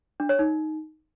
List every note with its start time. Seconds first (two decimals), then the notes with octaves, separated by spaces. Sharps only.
0.20 D4
0.29 C#5
0.39 D#4